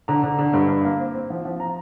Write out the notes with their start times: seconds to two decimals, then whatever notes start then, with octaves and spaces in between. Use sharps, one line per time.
0.08 D3 A#5
0.23 D3
0.39 D3
0.53 G2
0.69 G2
0.85 A#3
0.99 C4
1.14 C4
1.30 F3
1.45 F3
1.60 A#5